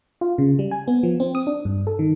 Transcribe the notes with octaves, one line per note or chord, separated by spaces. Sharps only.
F4
C#3
G3
G#5
B3
F3
C4
D#6
D4
G2
A4
D#3